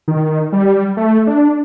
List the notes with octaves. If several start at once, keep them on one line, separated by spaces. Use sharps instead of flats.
D#3
G3
A3
D4